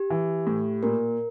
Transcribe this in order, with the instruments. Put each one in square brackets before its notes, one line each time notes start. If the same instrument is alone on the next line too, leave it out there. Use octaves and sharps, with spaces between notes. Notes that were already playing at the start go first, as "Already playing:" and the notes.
Already playing: [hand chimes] G4
[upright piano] E3
A2
[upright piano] A#2 [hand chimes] A#4